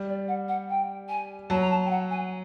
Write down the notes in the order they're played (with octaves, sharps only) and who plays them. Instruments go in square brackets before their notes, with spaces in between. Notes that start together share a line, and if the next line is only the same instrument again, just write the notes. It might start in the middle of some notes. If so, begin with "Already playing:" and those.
Already playing: [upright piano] G3
[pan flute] D5
F#5
F#5
G5
G#5
[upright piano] F#3 [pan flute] A5
[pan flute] A#5
A5
G5
F#5
G#5